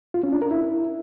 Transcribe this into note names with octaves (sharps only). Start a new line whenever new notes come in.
F4
C#4
D4
A#4
E4